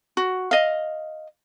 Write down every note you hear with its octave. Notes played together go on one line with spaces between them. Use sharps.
F#4
D#5 F5